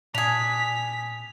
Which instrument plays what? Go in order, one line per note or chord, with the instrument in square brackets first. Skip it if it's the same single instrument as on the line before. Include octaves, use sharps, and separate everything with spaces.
[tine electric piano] A#2 [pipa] D4 G#4 [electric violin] B6 [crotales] F7